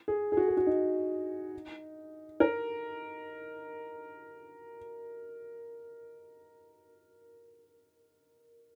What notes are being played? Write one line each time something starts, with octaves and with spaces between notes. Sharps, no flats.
G#4
G#4
F#4
G#4
F#4
D#4
A#4